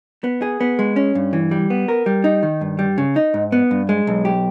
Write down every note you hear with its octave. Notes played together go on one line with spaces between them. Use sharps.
B3
G#4
B3
G#3
C#4
G2
E3
G3
B3
A#4
G3
D#4
D#3
G2
G3
C#3
D#4
G#2
B3
G2
G#3
B1
G4